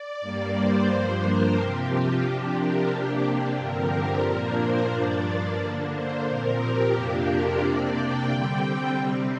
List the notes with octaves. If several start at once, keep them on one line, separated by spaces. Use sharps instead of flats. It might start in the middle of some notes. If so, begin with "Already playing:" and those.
Already playing: D5
G2 G3 A#3
C5
G2 F3 A#3 D4
A#4
C3 F3 C4 G4
F4
C3 F3 D4 G4
A#4
C3 A#3 D4 G4
G4
G2 D3 F3 C4 A#4
G4
A#2 F3 A#3 D4 A#4
C5
G2 F3 A#3 D4 D5
D3 A#3 D4
C5
A#2 F3 C4 A#4
G4
F2 C3 F3 A#3 D4 G4
A#4
C3 A#3 D4 D5
G5
D3 G3 C4
G5
C3 G3 C4